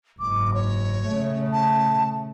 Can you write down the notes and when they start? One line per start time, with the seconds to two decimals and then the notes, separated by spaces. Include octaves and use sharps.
0.20 F#1 G#2 D6
0.54 C#5
1.08 C#3 A3
1.52 A5